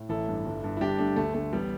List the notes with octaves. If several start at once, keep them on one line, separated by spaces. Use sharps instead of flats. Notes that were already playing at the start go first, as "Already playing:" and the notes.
Already playing: A2
A1 E4 A4
G2
G1
G2
E4
G1 D4 G4
G2 A3 D4
D2 A3
D3 A3
A1 G3 B3